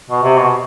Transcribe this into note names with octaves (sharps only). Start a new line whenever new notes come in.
B2
C3
B2